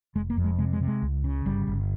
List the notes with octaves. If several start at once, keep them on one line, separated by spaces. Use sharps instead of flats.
F1 G#3
A#3
F2
G#3
C3 G#3
G#3
C3
G#3
C#2
C#3
G1 G3
G1